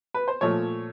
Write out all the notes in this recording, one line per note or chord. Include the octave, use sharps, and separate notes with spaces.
B4
C5
A#2 F3 A3 C#5